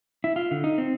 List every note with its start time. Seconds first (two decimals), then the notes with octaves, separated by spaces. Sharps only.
0.24 E4
0.36 F4
0.51 D3
0.64 D#4
0.78 C4